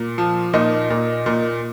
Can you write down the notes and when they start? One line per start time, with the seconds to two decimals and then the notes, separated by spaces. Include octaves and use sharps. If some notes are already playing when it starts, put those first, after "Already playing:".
Already playing: A#2
0.18 F3
0.53 A#2 D#4
0.90 A#2
1.26 A#2